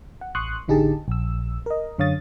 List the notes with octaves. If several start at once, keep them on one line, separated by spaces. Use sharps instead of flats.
F#5
A1 C6 C#6 D#6 F#6
A1 D3 D#4 G4 G#4 A5
A#1 E6
A#4 D#5
F#2 D3 C#5 F5 D#6 A6